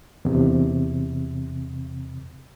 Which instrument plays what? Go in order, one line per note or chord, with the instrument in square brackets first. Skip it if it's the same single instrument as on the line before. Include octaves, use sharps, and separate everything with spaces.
[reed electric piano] E2 C3